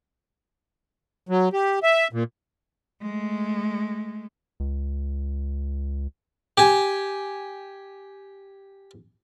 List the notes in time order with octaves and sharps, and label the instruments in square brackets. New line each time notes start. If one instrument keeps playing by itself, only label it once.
[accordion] F#3
G4
E5
A#2
[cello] G#3 A3
[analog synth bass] C#2
[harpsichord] G4 G#5